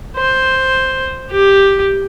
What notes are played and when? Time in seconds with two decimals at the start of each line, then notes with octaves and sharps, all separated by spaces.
0.17 C5
1.30 G4